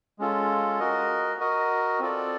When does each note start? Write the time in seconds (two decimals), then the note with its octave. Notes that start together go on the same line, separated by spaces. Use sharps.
0.19 G#3 C#4 F4 A4
0.79 F#4 A#4 D#5
1.40 F#4 A#4 D#5
2.00 C4 F4 A4 D5